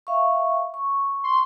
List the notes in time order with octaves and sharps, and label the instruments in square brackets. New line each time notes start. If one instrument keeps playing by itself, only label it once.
[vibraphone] E5 F5 C#6
C#6
[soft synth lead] C6